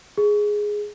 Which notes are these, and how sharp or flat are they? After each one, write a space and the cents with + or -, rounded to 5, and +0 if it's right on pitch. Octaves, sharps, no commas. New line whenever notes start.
G#4 +0